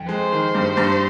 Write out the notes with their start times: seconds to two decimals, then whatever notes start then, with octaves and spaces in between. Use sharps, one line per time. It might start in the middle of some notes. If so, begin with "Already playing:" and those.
Already playing: F2
0.08 G#3 C5
0.32 D#3
0.55 G2
0.77 G2